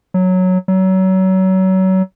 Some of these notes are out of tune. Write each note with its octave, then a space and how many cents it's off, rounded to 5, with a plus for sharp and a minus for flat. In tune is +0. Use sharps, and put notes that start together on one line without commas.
F#3 -5
F#3 +30